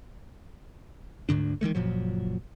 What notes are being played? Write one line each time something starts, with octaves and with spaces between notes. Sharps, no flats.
D2 G#2 D3 D4
D#3 E3 G#3 A3
F#1 A#2 F3 F#3